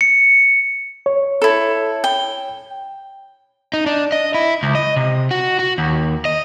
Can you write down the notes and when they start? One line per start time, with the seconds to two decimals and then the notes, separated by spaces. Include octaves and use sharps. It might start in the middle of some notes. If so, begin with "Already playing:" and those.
0.01 C#7
1.06 C#5
1.42 E4 A4
2.04 G5
3.73 D#4
3.86 D4
4.12 D#5
4.34 E4
4.63 C#2
4.75 D#5
4.96 C3
5.31 F#4
5.59 F#4
5.78 D#2
6.25 D#5